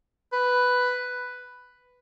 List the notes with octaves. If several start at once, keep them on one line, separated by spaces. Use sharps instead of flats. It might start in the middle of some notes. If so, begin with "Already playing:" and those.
B4